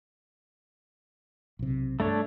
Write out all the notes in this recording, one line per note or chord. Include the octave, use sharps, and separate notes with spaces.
B1 C3
G2 A3 D4 C#5